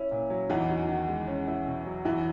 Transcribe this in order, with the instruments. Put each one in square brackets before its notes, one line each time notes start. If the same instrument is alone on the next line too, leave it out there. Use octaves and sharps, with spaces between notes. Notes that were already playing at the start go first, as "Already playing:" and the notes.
Already playing: [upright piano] C#4 [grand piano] E4
[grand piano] A#2
F#3
[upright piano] E2 E3 [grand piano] D#4
[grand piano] F#4
D#3
G#3
C#4
E4
B2
F#3
[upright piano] E2 E3 [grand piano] E4